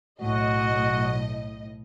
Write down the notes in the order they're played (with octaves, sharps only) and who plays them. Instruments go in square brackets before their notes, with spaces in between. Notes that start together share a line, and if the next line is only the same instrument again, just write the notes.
[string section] B1 A2 D#5 [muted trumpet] F#4